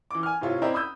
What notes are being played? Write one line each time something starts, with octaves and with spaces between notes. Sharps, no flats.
E3 D6
G#5 F6
A2 C3 F4 C#5
C4 D4 E4 D#5 G5 A#5
B5 D#6 E6 G6